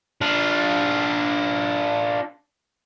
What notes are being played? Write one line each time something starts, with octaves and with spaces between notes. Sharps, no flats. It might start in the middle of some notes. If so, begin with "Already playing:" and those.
D4 F4